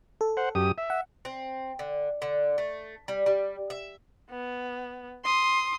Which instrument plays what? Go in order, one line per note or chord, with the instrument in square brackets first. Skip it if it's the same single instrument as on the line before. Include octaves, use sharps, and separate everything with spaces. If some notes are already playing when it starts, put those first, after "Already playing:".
[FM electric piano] A4
[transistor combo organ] C5 F#5
F#2 G4 D#6
E5
[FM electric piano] F#5
[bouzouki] C4
D3
D3
A3
G3
G3
E5
[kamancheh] B3
C6 D#6